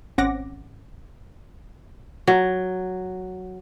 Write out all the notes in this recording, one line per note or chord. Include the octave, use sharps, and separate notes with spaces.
G#1 C4 C#4 F#5 D6 A#6
F#3